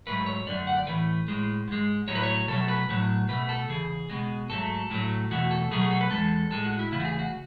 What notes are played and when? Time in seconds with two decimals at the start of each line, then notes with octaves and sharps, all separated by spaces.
0.07 G#2 F#3 A3 B4
0.26 C#5
0.47 F#2 D3 A3 D5
0.67 F#5
0.76 D5
0.87 A2 E3 A3 B4
1.28 A2 G#3
1.68 G#2 G#3
2.08 A2 F#3 A3 C#5
2.15 B4
2.23 C#5
2.48 B2 F#3 A3 A4
2.68 B4
2.89 A2 F#3 A3
3.28 B2 A3 B4
3.49 A4
3.69 E2 C#3 G#4
4.10 B2 G#3
4.49 G#2 F#3 A3 A4
4.90 A2 F#3 A3
5.30 E2 B2 A3 F#4
5.51 A4
5.71 B2 F#3 A3 G#4
5.81 G#4
5.91 A4
6.01 B4
6.11 E2 B2 G#3 A4
6.51 A2 G#3 A4
6.65 F#4
6.79 E4
6.92 E2 C#3 A3 E4
7.00 F#4
7.05 G#4
7.19 F#4